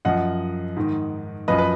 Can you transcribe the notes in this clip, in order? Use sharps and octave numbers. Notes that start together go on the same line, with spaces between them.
F#2 F3 D#5 F#5
G#2 D#3
F#2 F3 B4 D#5
B4